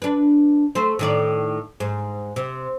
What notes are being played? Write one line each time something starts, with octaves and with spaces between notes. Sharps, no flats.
D4 B4
A3 C5
A2 D#3 D5
G#2
C3